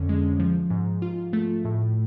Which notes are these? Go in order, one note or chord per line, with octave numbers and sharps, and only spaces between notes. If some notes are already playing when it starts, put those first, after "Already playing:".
Already playing: F2 D3 C#4
G#3
F3
G#2
F4
A3
A2